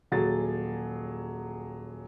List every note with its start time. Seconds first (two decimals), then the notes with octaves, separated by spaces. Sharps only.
0.12 D#1 F#3 G#4 A6